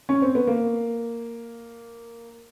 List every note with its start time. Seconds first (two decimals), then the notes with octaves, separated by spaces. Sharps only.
0.09 C#4
0.22 C4
0.35 B3
0.47 A#3